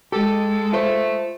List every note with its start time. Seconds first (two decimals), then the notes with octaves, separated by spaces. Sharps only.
0.12 G#3 G4 A4
0.73 A3 F4 C5